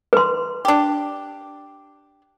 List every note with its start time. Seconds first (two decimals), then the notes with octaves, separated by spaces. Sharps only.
0.13 B4 C6
0.65 D4 G4